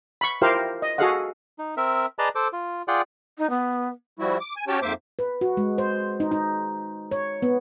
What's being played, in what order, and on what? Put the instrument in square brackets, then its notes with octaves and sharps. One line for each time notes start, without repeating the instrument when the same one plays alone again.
[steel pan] B5 C#6
E4 F4 G4 A#4 C5 F5
D#5
F#4 G#4 A4 D#5 F5 F#5
[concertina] D#4
C4 A#4 E5
G#4 B4 D5 D#5 A5 A#5
A4 C5 D6
F4
F4 G#4 D5 F#5 G5
[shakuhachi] D#4
B3
[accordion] F3 G3 E4 F#4
D6
G#5
C#4 F#4 G4 C#5 G5 A5
F2 G#2 A#3 C5 E5 D6
[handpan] B4
F#4
G#3
C5
D#4
D#4
C#5
B3